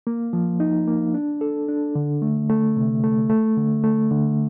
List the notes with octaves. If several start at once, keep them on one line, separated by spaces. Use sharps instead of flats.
A#3
F3
D#4
A#3
D4
A4
D4
D3
A3
A3
C3
A3
A3
D3
A3
D3